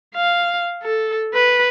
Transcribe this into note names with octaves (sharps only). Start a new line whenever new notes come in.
F5
A4
B4